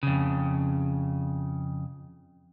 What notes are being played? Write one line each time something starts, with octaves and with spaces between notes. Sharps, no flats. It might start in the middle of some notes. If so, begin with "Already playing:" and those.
F2 C#3